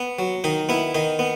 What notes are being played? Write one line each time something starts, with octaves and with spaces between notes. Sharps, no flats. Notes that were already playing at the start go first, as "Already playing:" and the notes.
Already playing: B3
F#3
D#3 D#4
B3 E4
D#3 D#4
B3